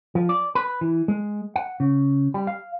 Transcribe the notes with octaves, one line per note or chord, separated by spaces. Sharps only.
F3
D5
B4
E3
G#3
F#5
C#3
G3
F5